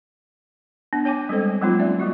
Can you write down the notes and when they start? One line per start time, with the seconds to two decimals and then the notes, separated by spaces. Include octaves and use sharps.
0.93 B3 D4
1.05 C#5 G5 G#5 D6
1.29 G3 G#3 C4 A4 C5
1.61 F#3 G#3 A#3 C4 D#4 F4
1.79 C#4 D5 E5
2.00 G3 A#3 F#4